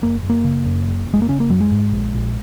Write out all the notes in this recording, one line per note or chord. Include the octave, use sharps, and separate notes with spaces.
F#1 A#3
F#1
A#3
C#3
F#2
F#1
F#1
G#3
A#3
C#3 C#4
A#3
F#2 F#3
G#3
G#2
A#1
A#1